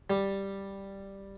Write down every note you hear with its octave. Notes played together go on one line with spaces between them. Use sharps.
G3